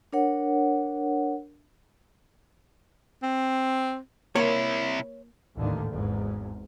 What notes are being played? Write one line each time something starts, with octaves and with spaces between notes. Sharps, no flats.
D4 A#4 C#5 F#5
C4
C3 A#3 E4 C#5
A1 D#2 G#2 D3 D#3
G#1 E2 G#2